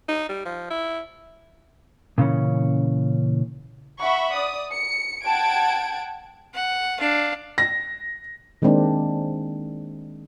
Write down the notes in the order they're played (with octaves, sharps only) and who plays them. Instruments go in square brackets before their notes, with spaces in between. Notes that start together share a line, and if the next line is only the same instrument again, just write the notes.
[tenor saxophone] D#4
G3
F3
E4
[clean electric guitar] A#2 C#3 E3 C#4
[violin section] E5 F#5 B5 C#6
D5 D#6
C#7
F#5 G5 A5 G#6 D7
[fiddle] F#5
D4 F5
[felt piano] A#6
[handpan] D#3 G#3 A#3 C4 D4